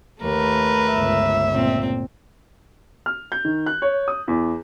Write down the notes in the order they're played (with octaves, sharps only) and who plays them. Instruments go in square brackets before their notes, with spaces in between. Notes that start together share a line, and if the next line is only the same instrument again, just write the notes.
[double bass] D#2 [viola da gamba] A3 A#4 B4
[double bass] G1 C#2 [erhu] E5
[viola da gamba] A#2 C4
[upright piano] F6
G6
D#3
F#6
C#5
D#6
E2